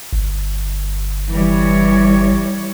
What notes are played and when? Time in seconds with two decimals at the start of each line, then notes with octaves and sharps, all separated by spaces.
0.13 G1
1.32 E3 G3 C#5